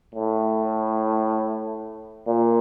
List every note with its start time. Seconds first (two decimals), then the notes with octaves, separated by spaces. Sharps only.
0.14 A2
2.27 A#2